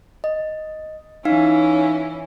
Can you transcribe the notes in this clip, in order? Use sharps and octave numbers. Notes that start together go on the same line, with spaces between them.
D#5
E3 C#4 D#4 E4 F5